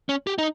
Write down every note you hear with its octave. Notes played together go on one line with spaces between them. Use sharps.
C#4
G4
D#4